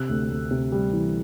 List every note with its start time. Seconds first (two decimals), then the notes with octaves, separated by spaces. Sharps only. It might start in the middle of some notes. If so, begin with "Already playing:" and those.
Already playing: C3 E6 F#6
0.09 D2
0.30 D2
0.51 C3
0.72 G3
0.93 E3